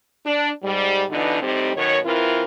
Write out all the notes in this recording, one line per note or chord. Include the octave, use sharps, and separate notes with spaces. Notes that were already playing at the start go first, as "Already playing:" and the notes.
D4
G#2 G3
B2 D3 E3 D4 D#4
A2 G3 C4 D#4 G4
F#2 B2 D#3 C#5
E3 C4 E4 F4 A#4